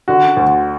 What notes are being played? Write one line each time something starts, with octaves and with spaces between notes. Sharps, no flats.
D3 F#4
D2